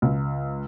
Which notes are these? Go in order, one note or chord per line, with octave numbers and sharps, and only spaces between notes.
C#2